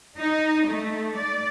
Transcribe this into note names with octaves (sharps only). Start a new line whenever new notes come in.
D#4
A3
D5